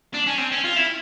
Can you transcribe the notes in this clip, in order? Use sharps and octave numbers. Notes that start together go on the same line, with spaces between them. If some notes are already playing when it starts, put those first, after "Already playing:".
D4
C#4
C4
C#4
F4
E4